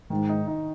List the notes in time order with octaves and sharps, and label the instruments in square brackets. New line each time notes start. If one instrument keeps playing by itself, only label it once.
[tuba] G#2 [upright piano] D#3
[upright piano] D#4
D#4